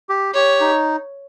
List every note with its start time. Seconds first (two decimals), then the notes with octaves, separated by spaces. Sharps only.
0.09 G4
0.34 G4 C#5
0.60 D#4